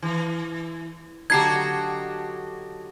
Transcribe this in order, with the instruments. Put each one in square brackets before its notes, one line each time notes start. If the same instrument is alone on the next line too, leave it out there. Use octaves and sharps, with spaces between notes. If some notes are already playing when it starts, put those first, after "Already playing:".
[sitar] E3
[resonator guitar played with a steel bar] D3 F#3 A3 [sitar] D#4 F#4 G4 [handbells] G#6 C7